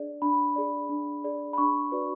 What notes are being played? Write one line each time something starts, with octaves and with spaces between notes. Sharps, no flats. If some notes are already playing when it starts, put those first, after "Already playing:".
Already playing: D4 G#4 D5
D4 B5
G#4 D5
D4
G#4 D5
B5
D4 C#6
F#4 B4 D5